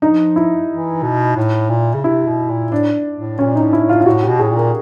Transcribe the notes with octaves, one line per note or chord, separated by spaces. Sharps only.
F3 D#4
E4
E3
B2
A2
A#2
C#3
C3 E4
B2
A#2
A2 D4
A2
A#2 C#4
D#4
A2
E4
A2
F4
F4
A2 F#4
G4
B2
A2 G#4
A#2
A#4